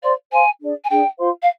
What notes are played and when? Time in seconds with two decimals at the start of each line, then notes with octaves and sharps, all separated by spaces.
0.03 C5 D5 F5 C6
0.31 C5 F5 G#5 C6
0.62 D4 G#4 D5
0.84 G#5
0.89 D4 G#4 D5 G5
1.19 F4 C5 F5 C6
1.42 F5